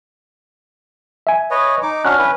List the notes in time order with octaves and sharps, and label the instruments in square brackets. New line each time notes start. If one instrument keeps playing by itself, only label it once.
[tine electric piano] E5 G#5
[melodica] B4 C#5 D#5
D#4 D6
[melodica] C#4 D4 F#4 [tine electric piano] F6 F#6
[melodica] C#4 E4 B4